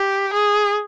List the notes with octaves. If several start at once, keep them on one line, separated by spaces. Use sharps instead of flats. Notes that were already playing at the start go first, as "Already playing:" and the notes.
Already playing: G4
G#4